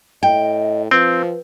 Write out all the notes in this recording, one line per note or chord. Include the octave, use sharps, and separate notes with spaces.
A2 D#5 G5
F3 C4 B4